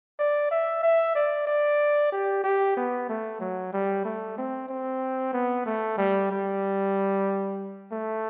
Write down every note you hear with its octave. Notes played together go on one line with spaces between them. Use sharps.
D5
E5
E5
D5
D5
G4
G4
B3
A3
F#3
G3
A3
C4
C4
B3
A3
G3
G3
A3